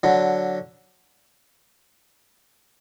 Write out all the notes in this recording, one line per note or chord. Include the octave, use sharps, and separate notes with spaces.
D3 F#3